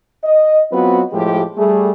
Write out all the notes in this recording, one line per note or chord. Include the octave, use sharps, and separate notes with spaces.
D#5
F#3 B3 C4 F4 F#4 B4
A2 F3 G#3 G4
G3 A3 G#4